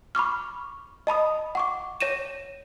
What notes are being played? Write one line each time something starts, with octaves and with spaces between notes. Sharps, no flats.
B5 C#6 D6 F6
D#5 A5 B5 D#6
F#5 C#6 D6
C#5 A#6 D#7 E7